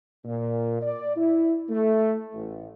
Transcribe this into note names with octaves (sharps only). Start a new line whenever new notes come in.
A#2
D5
E4
A3
A1